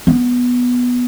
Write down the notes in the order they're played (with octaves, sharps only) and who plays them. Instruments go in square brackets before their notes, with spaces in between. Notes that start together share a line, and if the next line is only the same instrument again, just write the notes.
[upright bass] B3